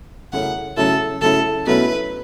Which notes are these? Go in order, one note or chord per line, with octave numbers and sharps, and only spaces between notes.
F#2 C#3 A3 C#4 E4 F#5
C#3 F#3 A3 C#4 E4 A4
C#3 F#3 A3 C#4 E4 A4
B2 F#3 A3 C#4 E4 B4